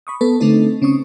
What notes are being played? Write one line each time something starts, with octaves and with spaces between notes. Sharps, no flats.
B5 C#6 D#6
B3 A4 B4 A5
D3 A3 C4 D#4 A4
C#3 C4 C#4 C#6 D#6